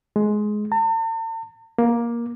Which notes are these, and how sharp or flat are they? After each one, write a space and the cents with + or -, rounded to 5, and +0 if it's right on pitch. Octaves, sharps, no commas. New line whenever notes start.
G#3 +15
A5 +45
A#3 +15